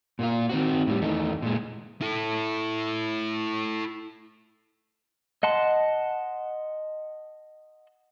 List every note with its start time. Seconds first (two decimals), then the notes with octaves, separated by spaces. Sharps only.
0.19 A#2 A#3 F4
0.49 D#3 C4 F#4
0.87 A2 G3
1.01 E2 D#3 A3 D#4
1.42 A#2 G#3
2.01 E4 A4
5.43 D#5 F#5 A5 C6